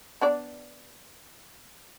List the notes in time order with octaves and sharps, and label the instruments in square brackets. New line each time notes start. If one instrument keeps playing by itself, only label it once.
[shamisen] B3 D4 D5